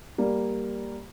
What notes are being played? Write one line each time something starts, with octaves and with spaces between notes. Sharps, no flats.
G3 A#3